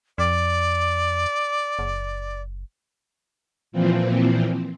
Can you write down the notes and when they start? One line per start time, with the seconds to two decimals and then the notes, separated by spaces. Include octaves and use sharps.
0.18 F2 D5
1.79 F#1
3.72 A#2 E3 F3 C4